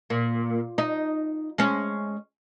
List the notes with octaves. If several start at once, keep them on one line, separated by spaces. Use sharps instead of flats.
A#2
D#4
G#3 C#4